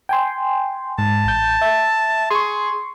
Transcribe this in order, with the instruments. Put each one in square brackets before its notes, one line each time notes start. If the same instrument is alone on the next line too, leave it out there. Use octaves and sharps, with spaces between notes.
[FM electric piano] G5 G#5 C6
[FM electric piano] G#2 [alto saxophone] A5
[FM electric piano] A1 G6
E5
[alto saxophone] G#4 [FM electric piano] C6 C#6